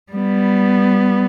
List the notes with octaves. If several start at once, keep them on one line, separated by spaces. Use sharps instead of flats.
G3 B3